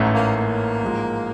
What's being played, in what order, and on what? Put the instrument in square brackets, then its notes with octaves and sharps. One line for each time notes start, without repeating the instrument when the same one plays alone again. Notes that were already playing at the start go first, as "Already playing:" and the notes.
Already playing: [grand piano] A1 G#2 E3 A3 C#4
[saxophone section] A#3
A#3
[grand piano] A1 G#2 F3 G#3